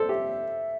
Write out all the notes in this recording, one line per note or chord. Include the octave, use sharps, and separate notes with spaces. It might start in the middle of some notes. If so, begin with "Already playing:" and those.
Already playing: A4 C5
G4 E5